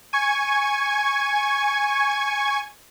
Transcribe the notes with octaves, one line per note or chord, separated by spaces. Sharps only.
G#5 C#6 G#6